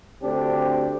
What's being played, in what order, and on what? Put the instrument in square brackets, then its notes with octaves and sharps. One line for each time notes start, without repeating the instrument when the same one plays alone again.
[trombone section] D2 C4 D4 G4